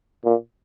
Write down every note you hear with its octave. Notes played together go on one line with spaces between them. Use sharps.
A#2